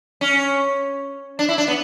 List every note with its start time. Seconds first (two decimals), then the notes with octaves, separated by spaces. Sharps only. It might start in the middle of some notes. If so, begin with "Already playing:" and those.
0.21 C#4
1.39 D4
1.49 E4
1.58 D4
1.68 B3